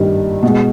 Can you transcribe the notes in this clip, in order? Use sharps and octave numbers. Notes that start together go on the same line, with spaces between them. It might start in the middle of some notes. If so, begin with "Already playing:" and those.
Already playing: G2 D#3 G3
B2 G#3